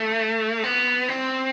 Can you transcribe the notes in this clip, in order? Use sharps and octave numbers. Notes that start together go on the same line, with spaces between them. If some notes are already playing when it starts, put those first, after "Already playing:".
Already playing: A3
B3
C4